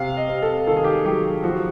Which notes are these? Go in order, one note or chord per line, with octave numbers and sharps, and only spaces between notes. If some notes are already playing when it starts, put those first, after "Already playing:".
Already playing: C3 F5
D#5
C3
A4
D#3 A4
G#4
G4
G#4
F#3 G4
F3 F#4